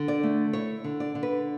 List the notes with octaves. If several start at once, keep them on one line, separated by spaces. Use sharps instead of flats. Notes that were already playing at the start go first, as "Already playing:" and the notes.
Already playing: D3
D5
A3
E4 C#5
D3
D5
D3
B4